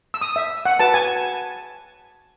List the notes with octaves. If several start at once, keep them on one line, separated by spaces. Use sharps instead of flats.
E6
D#6
E5
F#5
F#4 B4 A5
G#5